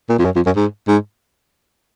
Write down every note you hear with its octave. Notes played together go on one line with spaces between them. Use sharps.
A#2
F2
F#2
F2
F#2
G#2
G#2